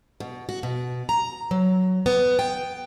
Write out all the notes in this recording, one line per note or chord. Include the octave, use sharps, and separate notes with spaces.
B2
F#4
B2
A#5
F#3
B3
G5